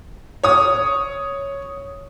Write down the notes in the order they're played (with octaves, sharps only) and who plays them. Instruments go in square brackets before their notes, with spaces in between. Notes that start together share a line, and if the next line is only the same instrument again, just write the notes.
[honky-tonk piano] C#5 D#6